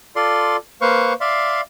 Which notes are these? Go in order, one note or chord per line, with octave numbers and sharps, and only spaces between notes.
F4 A4 D5 C6
A#3 B4 C5 F5 C#6
D5 E5 F5 C6